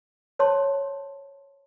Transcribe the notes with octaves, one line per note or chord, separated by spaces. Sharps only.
C5 C#5 A5 C6